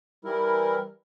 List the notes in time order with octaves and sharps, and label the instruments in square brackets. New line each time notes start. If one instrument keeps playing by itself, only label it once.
[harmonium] E3 G3 E4 A#4